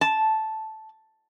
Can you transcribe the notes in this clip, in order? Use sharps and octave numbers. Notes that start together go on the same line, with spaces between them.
A5